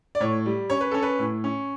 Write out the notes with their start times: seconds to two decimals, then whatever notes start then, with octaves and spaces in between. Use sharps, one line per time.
0.15 D5
0.20 A2 C#5
0.46 G3
0.70 C#4 C#5
0.81 B4
0.91 C#4 A4
1.03 B4
1.19 A2
1.44 C#4